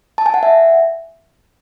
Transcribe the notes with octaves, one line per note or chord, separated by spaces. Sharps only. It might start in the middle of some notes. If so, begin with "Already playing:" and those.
A5
G#5
F#5
E5 G#5